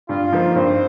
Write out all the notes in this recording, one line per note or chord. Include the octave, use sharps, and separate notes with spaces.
G2 F4
F3 A#3 D#4
G2 C5